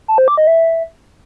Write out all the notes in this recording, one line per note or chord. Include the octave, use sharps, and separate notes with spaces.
A5
C5
D6
D#5
E5